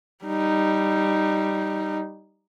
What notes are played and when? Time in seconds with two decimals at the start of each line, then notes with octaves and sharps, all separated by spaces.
0.24 G3 D#4